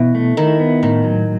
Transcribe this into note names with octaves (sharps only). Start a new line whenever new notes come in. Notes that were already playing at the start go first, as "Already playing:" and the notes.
Already playing: B2 E3
A3
D#3 E4
B3
A2 D#3
F#3